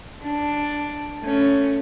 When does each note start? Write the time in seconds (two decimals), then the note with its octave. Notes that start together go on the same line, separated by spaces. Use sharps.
0.23 D4
1.24 A3 C#4